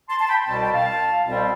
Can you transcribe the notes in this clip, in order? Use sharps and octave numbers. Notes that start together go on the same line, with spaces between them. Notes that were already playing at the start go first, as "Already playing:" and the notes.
A5 C6
A5
G5 B5
C2 B2 G3 C4 A5
G5
F5 A5
C2 B2 G3 C4